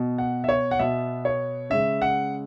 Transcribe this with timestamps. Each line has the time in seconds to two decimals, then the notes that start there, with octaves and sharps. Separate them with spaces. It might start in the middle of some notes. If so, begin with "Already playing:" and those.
Already playing: B2 B3
0.18 F#5
0.44 E5
0.49 C#5
0.71 F#5
0.79 B2 B3 E5
1.25 C#5
1.70 C#3 G#3 C#4 E5
2.02 F#5